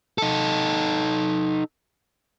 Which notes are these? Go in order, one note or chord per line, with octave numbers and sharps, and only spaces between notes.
D#4 A4